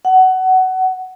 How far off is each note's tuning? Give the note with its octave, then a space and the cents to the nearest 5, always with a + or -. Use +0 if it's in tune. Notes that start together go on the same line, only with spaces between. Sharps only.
F#5 +20